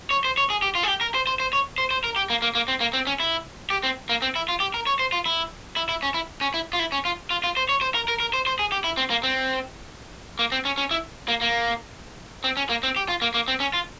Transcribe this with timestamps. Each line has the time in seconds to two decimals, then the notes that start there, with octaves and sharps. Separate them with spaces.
0.11 C#5
0.25 C5
0.37 C#5
0.50 G#4
0.62 G4
0.75 F4
0.83 G#4
0.88 G4
1.01 A#4
1.14 C5
1.27 C5
1.40 C5
1.53 C#5
1.78 C5
1.91 C5
2.04 A#4
2.16 G4
2.30 A#3
2.42 A#3
2.55 A#3
2.68 C4
2.80 A#3
2.93 C4
3.07 C#4
3.20 E4
3.70 G4
3.83 C4
4.09 A#3
4.22 C4
4.36 E4
4.49 F4
4.60 G4
4.74 A#4
4.87 C#5
4.99 C5
5.12 F4
5.26 E4
5.76 E4
5.89 E4
6.03 C#4
6.14 E4
6.41 C#4
6.54 E4
6.73 F4
6.79 E4
6.92 C#4
7.05 F4
7.30 F4
7.44 F4
7.57 C5
7.69 C#5
7.81 C5
7.95 A#4
8.08 A#4
8.20 A#4
8.33 C5
8.46 C5
8.59 G#4
8.72 G4
8.84 E4
8.97 C4
9.10 A#3
9.23 C4
10.39 A#3
10.52 C4
10.65 C#4
10.78 C#4
10.91 E4
11.28 A#3
11.41 A#3
12.44 C4
12.57 C#4
12.69 A#3
12.83 C4
12.96 G4
13.09 F4
13.22 A#3
13.34 A#3
13.48 C4
13.60 C#4
13.73 F4